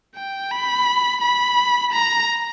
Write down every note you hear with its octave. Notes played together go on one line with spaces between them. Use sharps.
G5
B5
B5
A#5